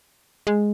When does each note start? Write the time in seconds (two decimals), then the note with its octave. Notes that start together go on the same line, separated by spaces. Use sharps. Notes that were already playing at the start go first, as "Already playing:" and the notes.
0.47 G#3